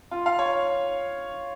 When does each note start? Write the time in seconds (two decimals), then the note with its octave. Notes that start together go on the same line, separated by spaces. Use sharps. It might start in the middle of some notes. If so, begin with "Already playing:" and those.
0.11 F4
0.26 F5
0.39 C#5